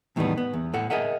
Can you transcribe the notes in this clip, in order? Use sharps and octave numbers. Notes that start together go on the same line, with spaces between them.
E2 A2 D#3 E3 G3 B3
B3
E2
A2 A4 F#5
G#4 A#4 D#5 E5 F#5